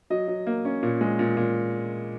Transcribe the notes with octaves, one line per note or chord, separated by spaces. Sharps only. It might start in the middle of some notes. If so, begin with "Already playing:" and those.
F#3 D#5
F#3
A#3
C#4
A#2
G#3
A#2
A#2